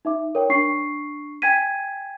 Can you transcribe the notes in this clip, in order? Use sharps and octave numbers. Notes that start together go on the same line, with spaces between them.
D#4 E5 D6
A#4 C#5 G5
D4 C#6 C7
G5 G#5 G#6 B6 D#7